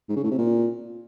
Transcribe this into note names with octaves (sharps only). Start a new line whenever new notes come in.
G#2
C#3
A2
C3
A#2